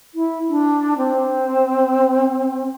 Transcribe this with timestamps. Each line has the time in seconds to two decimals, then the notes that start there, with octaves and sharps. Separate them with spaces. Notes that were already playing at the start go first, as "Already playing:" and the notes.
0.15 E4
0.49 D4
0.98 C4